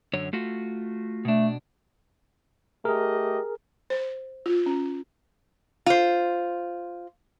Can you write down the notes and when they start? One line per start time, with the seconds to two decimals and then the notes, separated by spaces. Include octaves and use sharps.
0.13 F#2 D3 C#5
0.33 A3 F4 F#4
1.25 B2 A3 D4
2.85 A3 G4 G#4 A#4 D#5
3.90 C5
4.46 F4
4.66 C#4
5.86 F4 C5